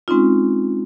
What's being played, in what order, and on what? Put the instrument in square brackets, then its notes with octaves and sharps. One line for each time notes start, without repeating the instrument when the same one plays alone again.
[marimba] G#3 C4 C#4 D#4 F4